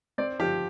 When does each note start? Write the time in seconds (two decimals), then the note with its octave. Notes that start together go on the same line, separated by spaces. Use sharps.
0.18 C4 D5
0.39 F3 G4